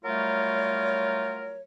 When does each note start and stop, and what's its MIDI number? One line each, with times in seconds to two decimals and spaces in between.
0.04 1.61 54
0.04 1.61 55
0.04 1.61 57
0.04 1.61 65
0.04 1.61 70
0.04 1.61 73